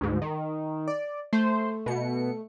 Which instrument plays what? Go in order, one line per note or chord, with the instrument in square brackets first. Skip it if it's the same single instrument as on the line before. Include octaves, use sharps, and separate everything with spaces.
[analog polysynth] D2 G#2
D#3
[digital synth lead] D5
[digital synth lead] A3 [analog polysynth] C5
[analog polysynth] B2 C#7